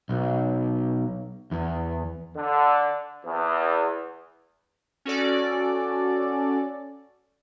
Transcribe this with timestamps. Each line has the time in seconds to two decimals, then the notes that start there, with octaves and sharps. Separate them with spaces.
0.09 B1
1.51 E2
2.35 D3
3.25 E2
5.05 C#4 F#4 A4 D5